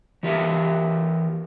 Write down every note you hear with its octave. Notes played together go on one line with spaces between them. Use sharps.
E3 G4 A#4 E5